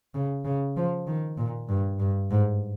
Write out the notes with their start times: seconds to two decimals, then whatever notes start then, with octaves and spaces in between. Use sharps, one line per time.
0.15 C#3
0.45 C#3
0.76 F3
1.07 D#3
1.38 A#2
1.69 G2
2.00 G2
2.31 G#2